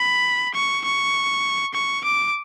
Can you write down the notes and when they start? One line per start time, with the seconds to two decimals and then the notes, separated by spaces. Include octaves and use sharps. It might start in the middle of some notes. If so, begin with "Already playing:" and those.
Already playing: B5
0.54 C#6
0.85 C#6
1.74 C#6
2.04 D6